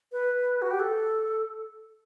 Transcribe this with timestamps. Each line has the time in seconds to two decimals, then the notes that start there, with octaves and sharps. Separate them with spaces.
0.12 B4
0.62 F#4
0.71 G4
0.80 A4